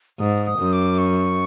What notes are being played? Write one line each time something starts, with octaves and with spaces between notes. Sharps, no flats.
G#2 D#6
D#6
F#2
D6
C#6